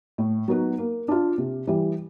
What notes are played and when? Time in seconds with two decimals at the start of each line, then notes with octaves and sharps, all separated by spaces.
0.18 A2
0.48 F#3 B3 D#4 F#4
0.78 A#3
1.08 D4 F4
1.38 C3
1.67 E3 G3